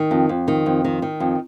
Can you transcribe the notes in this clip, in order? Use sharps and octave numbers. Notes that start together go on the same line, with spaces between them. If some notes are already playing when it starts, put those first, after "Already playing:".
Already playing: D#3
F2
F2
D#3
F2
D#3
D#3
F2